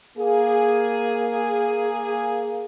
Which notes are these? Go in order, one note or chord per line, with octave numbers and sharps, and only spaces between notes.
A#3 G#4